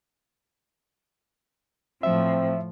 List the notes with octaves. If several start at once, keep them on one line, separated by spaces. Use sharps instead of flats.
A2 F3 C4 E5